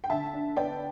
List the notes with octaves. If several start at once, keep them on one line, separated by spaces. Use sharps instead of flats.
G5
D3 E5 A5
D4
B3 D5 G5